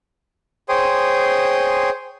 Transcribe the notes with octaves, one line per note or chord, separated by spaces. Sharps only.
G#4 C5 C#5 G5 C6 D#6